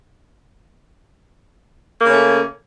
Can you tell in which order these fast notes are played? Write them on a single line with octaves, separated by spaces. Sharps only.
A#3 C#3 C#4 A3